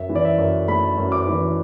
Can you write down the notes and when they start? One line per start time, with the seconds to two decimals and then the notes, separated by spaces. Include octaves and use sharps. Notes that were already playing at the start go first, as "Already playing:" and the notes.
Already playing: F#2 E5
0.09 E3
0.15 D5
0.25 E5
0.38 F#2
0.68 A3 B5
0.98 F#2
1.12 D6
1.27 E3